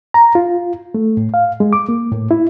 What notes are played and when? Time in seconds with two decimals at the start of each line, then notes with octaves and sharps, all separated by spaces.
0.14 A#5
0.35 F4
0.95 A3
1.17 A2
1.34 F5
1.60 G#3
1.73 D6
1.89 A#3
2.12 A2
2.31 E4